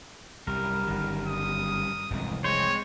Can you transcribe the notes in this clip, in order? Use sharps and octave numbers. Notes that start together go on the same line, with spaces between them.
C2 F#2 G3 A#4
G1 D#3
D#6
F1 C2 F2 G#2 E3
G#3 C4 C5 C#5